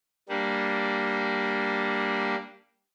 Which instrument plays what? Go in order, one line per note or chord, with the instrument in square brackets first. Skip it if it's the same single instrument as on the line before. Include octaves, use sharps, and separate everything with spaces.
[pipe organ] G3 A#3 D4